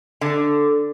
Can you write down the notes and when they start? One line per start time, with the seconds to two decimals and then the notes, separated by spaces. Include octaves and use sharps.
0.21 D3